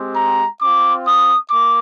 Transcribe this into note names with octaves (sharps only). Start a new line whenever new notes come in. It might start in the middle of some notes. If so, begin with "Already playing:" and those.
Already playing: G#3 C4 G4
A#5
C4 F4 D6
D#6
A#3 D6